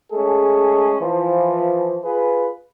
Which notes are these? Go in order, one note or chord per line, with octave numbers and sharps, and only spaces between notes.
G#3 A3 C#4 G#4 A4
E3 F3
F4 G#4 B4